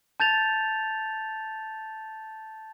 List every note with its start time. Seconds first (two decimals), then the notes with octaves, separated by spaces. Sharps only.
0.20 A5 G6 A6 F7